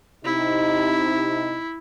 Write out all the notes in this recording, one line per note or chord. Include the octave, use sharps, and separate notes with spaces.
C3 D#4 E4